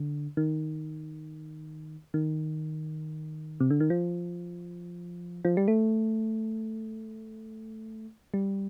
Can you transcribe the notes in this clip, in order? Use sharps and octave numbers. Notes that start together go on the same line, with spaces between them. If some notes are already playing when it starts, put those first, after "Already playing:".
Already playing: D3
D#3
D#3
C3
D3
D#3
F3
F3
G3
A3
G3